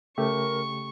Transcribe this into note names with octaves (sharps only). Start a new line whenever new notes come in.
C#3 A3 G4 A#4 C#6